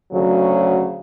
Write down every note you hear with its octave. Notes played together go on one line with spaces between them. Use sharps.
D2 C#3 F#3